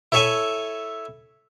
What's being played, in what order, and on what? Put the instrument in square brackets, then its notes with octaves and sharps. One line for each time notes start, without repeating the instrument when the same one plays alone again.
[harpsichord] E4 A4 C#5 E5 G#5